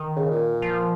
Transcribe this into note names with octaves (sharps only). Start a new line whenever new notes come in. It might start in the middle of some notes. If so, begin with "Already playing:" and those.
Already playing: D#3
C#3
A#2
F3